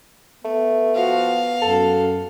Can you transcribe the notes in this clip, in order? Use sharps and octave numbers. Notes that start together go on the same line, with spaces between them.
A3 B3
F3 F#4 F5
F#2 A4